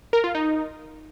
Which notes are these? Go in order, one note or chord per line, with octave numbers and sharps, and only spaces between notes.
A#4
F4
D#4